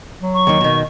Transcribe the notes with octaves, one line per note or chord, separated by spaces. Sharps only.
F#3
C#6
D#2 D#3
B2 D#3